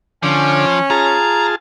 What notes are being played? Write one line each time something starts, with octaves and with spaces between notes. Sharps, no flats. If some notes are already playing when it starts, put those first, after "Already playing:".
D3 F3 C#4 D6
F4 G#4 A5 A#5